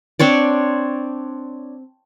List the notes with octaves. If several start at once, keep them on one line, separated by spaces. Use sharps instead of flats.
C4 D4 C#5 D5